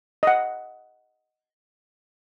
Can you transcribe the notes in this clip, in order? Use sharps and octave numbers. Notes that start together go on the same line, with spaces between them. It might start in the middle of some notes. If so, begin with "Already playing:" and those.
D#5 F#5